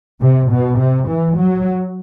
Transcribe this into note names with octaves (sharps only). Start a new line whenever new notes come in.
C3
B2
C3
E3
F#3